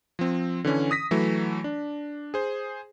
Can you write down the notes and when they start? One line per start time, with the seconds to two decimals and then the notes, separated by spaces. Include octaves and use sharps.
0.19 F3 C4
0.64 D3 E3 C#4
0.91 D#6 A#6 B6
1.11 E3 F#3 A3
1.64 D4
2.34 G#4 C5